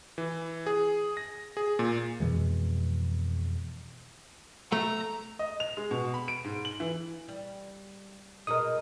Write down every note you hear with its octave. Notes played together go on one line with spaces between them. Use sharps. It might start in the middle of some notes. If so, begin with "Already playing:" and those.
E3
G#4
A#6
G#4
A#2
F2 B2 E3 G#3
A3 A#5
D#5
F7
G#3
B2
B5
D7
G#2
F#7
E3
G3
B2 G#3 D#4 A#4 D#6